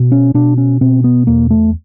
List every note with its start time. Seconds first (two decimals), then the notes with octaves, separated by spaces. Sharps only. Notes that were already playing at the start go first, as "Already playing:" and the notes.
Already playing: B2
0.12 C#4
0.34 B2 D4
0.58 C#4
0.81 B2 C4
1.04 B3
1.27 E2 A#3
1.50 A3